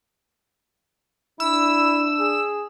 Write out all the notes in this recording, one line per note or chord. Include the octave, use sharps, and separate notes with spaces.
D4 E4 E6
G#4